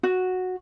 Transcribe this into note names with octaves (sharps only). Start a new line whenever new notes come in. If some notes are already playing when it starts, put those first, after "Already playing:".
F#4